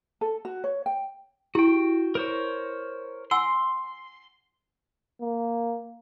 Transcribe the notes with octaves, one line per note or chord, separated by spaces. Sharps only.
A4
F#4
C#5
G5
E4 F#4 G4 G5
A#4 C5 C#5
F#5 G#5 C6 E6
A#3